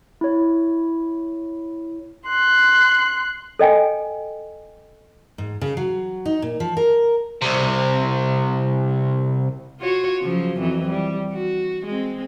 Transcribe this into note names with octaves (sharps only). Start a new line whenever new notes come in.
E4 C#5
C6 F#6
A4 D#5 G5 G#5
G#2
C#3
F#3
D#4
A#2
F3
A#4
C2 C3
F4 F#4 C#5
C#3 F3 F#3
F2 E3 F#3
G3
F#4
G#3 C4